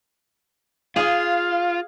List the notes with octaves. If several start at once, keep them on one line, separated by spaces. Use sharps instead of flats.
F4 G#4 F5